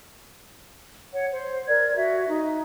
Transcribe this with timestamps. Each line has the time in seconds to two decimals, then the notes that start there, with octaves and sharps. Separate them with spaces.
1.13 C#5 F#5
1.31 C5
1.68 A#4 D5 G#6
1.96 F#4 E5
2.28 D#4